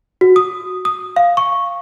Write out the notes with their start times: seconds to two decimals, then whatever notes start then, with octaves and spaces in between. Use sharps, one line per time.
0.21 F#4
0.36 D#6
0.85 D#6
1.16 F5
1.37 C#6